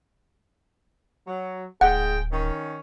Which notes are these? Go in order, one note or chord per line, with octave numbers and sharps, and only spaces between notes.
F#3
D1 G#2 G#4 F#5 G5
D#3 C#4